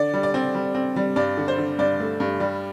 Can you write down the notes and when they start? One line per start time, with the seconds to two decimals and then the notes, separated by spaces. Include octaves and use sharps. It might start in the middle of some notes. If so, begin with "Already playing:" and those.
Already playing: D3 D5
0.14 G3
0.23 D5
0.34 C4
0.55 G3
0.75 C4
0.96 G3
1.16 G2 D5
1.37 D3
1.48 C5
1.58 D3
1.78 G2 D5
2.00 A3
2.20 G2
2.40 G3